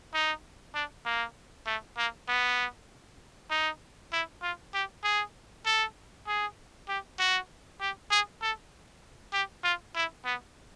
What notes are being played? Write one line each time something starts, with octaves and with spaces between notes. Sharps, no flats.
D#4
D4
A#3
A3
A#3
B3
D#4
E4
F4
G4
G#4
A4
G#4
G4
F#4
G4
G#4
A4
G4
F4
E4
B3